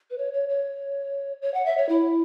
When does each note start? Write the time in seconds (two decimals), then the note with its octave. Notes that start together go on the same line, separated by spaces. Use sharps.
0.10 B4
0.18 C#5
0.33 C#5
0.49 C#5
1.42 C#5
1.54 F#5
1.66 E5
1.77 C#5
1.89 E4